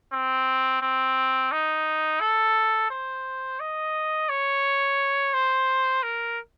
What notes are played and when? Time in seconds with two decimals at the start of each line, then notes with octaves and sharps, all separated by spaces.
0.12 C4
0.82 C4
1.52 D#4
2.21 A4
2.90 C5
3.60 D#5
4.29 C#5
5.34 C5
6.03 A#4